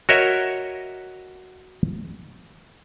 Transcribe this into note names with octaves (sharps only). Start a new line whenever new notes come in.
F#4 A#4 C#5 D#5 E5